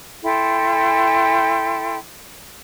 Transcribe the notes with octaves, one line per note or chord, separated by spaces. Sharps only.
E4 A4 G5 C6